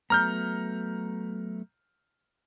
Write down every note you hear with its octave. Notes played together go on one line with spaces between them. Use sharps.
F#3 A3 B3 A#5 F6 G6